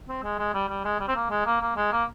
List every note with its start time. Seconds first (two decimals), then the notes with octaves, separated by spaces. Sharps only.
0.08 C4
0.23 G#3
0.39 G#3
0.54 G3
0.69 G3
0.85 G#3
1.00 G3
1.08 C4
1.15 A#3
1.30 G#3
1.46 A#3
1.61 A#3
1.76 G#3
1.92 A#3